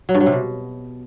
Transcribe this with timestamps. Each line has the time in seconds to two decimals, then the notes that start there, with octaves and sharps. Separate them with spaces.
0.09 F#3
0.15 G2
0.20 F#3
0.26 C3
0.32 B2